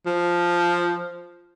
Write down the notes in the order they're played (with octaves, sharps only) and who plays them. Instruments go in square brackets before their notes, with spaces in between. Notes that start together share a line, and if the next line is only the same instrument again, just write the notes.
[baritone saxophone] F3